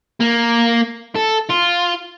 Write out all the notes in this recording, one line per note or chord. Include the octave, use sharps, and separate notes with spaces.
A#3
A4
F4